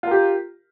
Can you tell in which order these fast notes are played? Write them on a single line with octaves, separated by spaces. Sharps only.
F4 A#4 G4